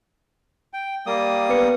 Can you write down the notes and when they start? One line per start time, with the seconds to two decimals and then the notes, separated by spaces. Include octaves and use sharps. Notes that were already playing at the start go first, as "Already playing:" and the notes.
0.74 G5
1.06 G3 A#3 D#6
1.49 B3 B4 C#7